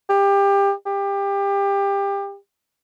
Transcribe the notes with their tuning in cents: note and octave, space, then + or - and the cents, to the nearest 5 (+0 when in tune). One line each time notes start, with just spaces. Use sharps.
G4 +25
G4 +25